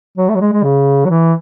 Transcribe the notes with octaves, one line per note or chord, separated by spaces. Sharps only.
F#3
A3
F#3
G#3
G#3
C#3
F#3
E3